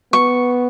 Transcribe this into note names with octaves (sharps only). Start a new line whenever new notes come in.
B3 C#6